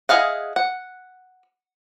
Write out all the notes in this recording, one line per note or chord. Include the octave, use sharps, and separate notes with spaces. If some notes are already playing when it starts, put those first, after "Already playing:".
E4 G#4 D#5 F5 F#5
F#5